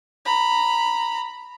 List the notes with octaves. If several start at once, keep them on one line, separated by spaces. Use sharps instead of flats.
A#5 B5